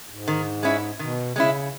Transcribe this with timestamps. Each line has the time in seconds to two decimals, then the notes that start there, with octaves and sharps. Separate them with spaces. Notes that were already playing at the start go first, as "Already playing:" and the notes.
0.10 G#2
0.28 D#3
0.63 G#3 C#4 E4
0.99 B2 D#3
1.36 C#3 G#3 C#4 E4